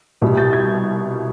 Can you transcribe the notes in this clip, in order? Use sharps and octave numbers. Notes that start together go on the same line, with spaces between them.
C2 B2 G3
G6 A6
G#6